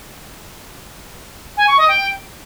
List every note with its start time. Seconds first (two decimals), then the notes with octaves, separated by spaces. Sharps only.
1.57 G#5
1.67 C#6
1.77 D#5
1.88 G5